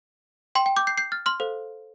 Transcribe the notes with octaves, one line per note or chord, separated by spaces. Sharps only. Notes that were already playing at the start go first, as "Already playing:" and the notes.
G5 C6
G5
D6 G6
G6 C7
G6 C7
F6 A6
C6 F6
A4 C5 F5